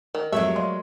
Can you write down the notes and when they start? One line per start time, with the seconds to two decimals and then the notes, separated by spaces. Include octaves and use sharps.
0.15 D#3 A#4
0.32 F2 F#3 G#3 A3 G4 E5 G#6
0.56 D5 D#5 F5 C6